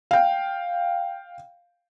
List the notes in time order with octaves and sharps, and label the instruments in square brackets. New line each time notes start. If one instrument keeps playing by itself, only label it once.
[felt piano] F5 G5